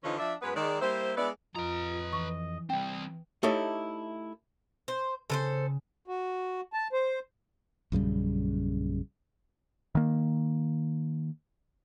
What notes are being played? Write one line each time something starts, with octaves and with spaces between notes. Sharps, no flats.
D3 E3 F3 C#4 D#4 F4
F3 D4 D5 E5
F#2 G#3 B3 B4
D#3 G#3 D5
G3 A#3 E4 C5
G#3 B3 E4 B4 D5
F2 F4 B4 D#5 A#5
E3 C#6
G3 C4 G5
A3 D#4 E4 G4 A4 C#5
C5
C#3 A4 B4 C5
F#4
A5
C5
A#1 F#2 C#3 G3
D#3 A#3